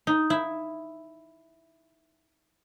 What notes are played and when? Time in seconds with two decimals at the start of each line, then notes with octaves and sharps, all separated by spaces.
0.07 D#4
0.30 E4